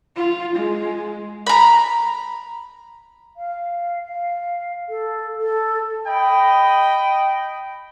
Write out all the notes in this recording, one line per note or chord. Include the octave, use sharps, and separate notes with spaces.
F4
G#3
A#5 B5
F5
F5
A4
A4
D#5 G5 B5